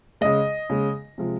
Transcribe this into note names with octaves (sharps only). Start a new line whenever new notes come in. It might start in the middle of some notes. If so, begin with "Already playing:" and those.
C#3 G#3 D#5
C#3 G#3
C3 F3 G#3